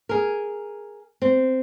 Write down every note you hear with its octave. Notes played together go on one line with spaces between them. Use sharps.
G#4 A#4
C4